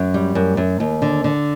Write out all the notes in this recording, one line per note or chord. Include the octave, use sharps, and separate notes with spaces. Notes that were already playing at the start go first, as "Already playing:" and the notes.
Already playing: F#2
G3
F#2
F#2
D#2
D3
D3